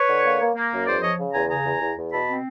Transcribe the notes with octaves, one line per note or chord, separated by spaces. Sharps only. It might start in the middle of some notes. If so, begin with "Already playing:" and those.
Already playing: B4 C#5
D3
A#3
A#3
A#3
F#2
E2 C5 D5
F3 C#5 D#5
C#3
E2 G#5 A#5
C#3 G#5 A#5
E2
E2
E2
B2 A5 B5
C4